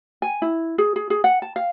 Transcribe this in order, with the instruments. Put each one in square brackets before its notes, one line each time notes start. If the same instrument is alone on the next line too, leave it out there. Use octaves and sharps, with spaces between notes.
[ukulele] G#5
E4
G#4
G#4
G#4
F#5
A5
F5